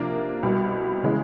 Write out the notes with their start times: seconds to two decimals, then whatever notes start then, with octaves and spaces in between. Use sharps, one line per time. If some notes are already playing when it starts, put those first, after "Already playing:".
Already playing: C3 F3 A#3 D4
0.43 C2 B2 G3
1.03 C#3 E3 G#3